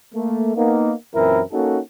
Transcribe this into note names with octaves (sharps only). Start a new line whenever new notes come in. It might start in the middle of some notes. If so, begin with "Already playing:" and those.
A3 A#3
A#3 B3 D#4
F#2 A#2 E3 C4 E4 A#4
A#3 C#4 D#4 F#4 A4